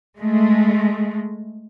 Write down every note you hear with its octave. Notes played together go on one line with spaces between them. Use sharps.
G#3 A3